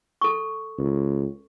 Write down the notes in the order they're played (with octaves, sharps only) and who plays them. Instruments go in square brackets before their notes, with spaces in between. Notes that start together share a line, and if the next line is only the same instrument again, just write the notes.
[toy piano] A4 C#6
[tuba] C#2